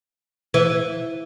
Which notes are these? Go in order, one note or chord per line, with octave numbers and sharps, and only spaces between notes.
E3